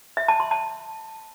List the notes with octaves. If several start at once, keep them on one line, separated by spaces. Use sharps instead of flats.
E5
A5
C6
A5